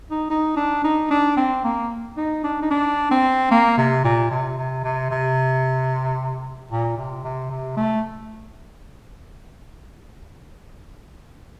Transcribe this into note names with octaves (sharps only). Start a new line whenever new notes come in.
D#4
D#4
D4
D#4
D4
C4
A#3
D#4
D4
D#4
D4
C4
A#3
C3
A#2
C3
C3
C3
C3
A#2
C3
C3
C3
A3